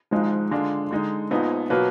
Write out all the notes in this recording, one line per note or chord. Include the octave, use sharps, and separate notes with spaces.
G#1 G#2 F3 G#3 D#4
D3 G#3 D4 F4
D3 G#3 D#4
A#1 A#2 F3 B3 D#4
B2 F#3 A#3 F4 B4